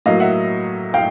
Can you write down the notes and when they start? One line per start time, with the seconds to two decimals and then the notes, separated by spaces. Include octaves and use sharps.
0.06 A2 F#3 A#3 D#5 F5
0.20 E5 F#5
0.94 F5 G5